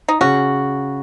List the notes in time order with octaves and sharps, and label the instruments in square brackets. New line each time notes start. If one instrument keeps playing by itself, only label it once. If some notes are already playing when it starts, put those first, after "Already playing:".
[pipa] D#4
[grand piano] C#3 [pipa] C#4 F#4